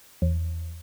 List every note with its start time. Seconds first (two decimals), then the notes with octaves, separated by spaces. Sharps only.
0.22 E2